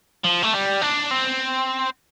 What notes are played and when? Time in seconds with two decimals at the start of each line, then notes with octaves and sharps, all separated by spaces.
0.24 F3
0.42 A3
0.53 G3
0.82 D4
1.11 C4